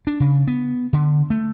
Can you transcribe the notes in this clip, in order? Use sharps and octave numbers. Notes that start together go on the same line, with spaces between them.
D4
C#3
B3
D3
A3